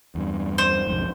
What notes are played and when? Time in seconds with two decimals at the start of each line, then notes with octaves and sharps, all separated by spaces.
0.15 E2 G2
0.58 C5
0.87 B1 F2 G#2